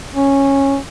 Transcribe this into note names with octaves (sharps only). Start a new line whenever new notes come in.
C#4